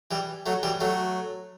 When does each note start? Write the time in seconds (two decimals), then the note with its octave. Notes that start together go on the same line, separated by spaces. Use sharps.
0.11 E3 G3
0.46 F#3 A3
0.63 E3 G3
0.80 F#3 A3